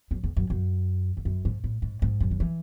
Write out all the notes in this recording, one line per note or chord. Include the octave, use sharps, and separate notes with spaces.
F#2
E2
F#2
F#2
E2
F#2
G#2
A2
G#2
G#2
F#2
D3
E3